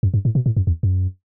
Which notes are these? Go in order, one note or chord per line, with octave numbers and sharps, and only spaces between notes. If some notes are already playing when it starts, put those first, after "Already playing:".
F#2
G2
A2
B2
A2
F#2
E2
F#2